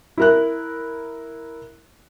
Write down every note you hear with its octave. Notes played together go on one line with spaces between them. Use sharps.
E4 A#4 F#6